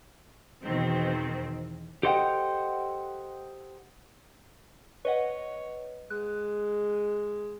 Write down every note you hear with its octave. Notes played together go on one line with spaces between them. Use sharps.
E2 B2 D#3 C4
G4 A4 C5 D#5 F#5 G5
B4 C#5 D#5 F#5
G#3 F#6